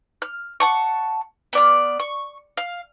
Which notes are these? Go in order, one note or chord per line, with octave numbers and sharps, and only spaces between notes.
F6
F#5 A5 C#6
B3 D5 F6
C#6
F5